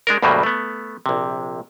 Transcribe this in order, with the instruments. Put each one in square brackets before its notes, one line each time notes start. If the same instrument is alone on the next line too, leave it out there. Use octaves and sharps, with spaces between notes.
[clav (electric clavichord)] G#3 D4 A#4
D2 G2 B2 F#3 G3 A#3
A3 B3
A#1 C3